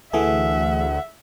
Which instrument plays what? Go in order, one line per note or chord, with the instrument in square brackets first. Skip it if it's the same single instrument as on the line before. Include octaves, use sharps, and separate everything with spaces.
[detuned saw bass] D2 [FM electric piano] E3 A3 G#4 [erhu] E5 [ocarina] F#5